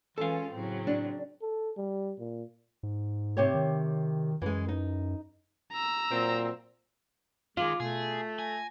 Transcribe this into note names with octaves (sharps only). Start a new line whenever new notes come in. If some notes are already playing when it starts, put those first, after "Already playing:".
E3 G#3 C#4 F4 A4 F5
A2 C#3 F#3 C4
D4
A4
G3
A#2
G#2
C3 G4 C#5
D#3
F#2 E3 G#3
D#4
A#5 E6
A#2 F#3 C4
D#3 G#3 F4 D6
B2 A3 G#4
G#5 A#6